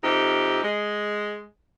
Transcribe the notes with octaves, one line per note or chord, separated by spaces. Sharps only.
F2 C3 D#4 G4
G#3